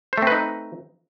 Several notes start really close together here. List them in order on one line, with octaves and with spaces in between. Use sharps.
C5 A3 C4 B4 D#4